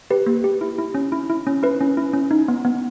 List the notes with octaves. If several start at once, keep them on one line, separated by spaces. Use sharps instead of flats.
G4 B4
A#3
G4
E4
E4
C#4
E4
E4
C#4
E4 B4
C#4
E4
C#4
D#4
B3
B3